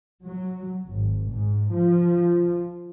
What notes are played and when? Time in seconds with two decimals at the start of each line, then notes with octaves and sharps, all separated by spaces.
0.25 F#3
0.87 G#1
1.32 G#2
1.73 F3